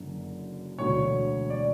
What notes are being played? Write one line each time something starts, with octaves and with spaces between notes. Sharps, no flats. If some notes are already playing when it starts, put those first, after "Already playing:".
Already playing: F#1 F#2 D3
E1 D2 D3 C#5
D5